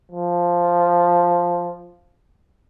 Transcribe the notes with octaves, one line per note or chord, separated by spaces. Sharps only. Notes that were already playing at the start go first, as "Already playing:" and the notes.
F3